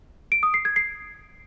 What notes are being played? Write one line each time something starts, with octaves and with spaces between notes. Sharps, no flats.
D7
D#6
C7
G#6
C7